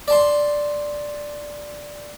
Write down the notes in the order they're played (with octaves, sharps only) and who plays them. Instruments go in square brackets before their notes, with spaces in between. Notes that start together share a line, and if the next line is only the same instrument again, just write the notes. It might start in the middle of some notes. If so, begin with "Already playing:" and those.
[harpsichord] D5 A5 C6